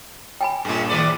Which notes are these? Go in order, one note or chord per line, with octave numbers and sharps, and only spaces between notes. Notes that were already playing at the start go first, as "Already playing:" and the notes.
G5 G#5 B5
G2 A#2 C#3 G#3
D#3 B4 D5